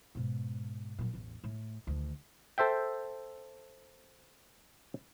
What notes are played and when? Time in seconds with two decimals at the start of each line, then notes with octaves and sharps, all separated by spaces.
0.15 G#2 B2
0.98 F#2 A#2
1.14 A1 E2
1.44 A2
1.87 D2 D#3
2.58 A4 C5 E5 G5